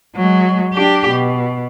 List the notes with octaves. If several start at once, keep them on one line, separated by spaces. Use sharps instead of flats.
F#3 G#3
D4 G4
B2